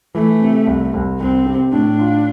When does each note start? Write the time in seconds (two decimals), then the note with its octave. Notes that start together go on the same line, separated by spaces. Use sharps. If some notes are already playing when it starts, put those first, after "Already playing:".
0.15 E3 A3
0.41 C3
0.67 C2
0.93 C2
1.20 C2 C4
1.46 C3
1.72 A2 D4
1.99 F4